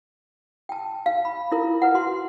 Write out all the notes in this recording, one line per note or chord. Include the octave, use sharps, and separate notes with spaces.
G5 A5
F5
B5
E4 F4 A#4
A#4 B4 F#5
F#4 C6